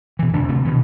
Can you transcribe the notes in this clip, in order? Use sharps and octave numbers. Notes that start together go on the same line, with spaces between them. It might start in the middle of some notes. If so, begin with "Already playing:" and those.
B2 E3
F1 D2 D#3 D4
D1 C3 A3
B2 D#3 E3